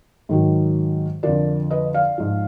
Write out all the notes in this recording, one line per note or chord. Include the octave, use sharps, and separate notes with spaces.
G#2 D#3 F#3
F2 D3 F3 A#4 D5
B4 D#5
D5 F5
G#2 F3